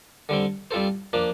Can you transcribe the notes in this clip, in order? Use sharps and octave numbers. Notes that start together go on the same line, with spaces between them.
D3 G3 C4
G3 C4 F4 A4 C5
F3 A#3 D4